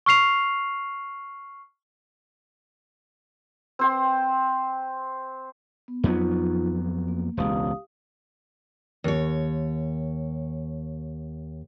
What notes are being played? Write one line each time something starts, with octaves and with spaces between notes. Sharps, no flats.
C#6 F6 C7 F7
C4 C5 G5
B3
F2 F#3 B3 D#4 F4
A#3
E1 C#2 G4 F5 D#6
D#2 C#5